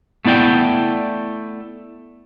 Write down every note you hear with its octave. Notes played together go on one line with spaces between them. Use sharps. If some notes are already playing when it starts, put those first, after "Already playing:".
A3 B3 E4 D5 G5